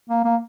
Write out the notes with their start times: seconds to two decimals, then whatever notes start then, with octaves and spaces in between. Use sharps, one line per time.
0.09 A#3
0.25 A#3